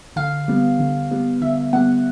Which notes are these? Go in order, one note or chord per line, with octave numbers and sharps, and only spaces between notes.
D3 F5
G3 B3
D3
G3 B3
D3 E5
G3 B3 F#5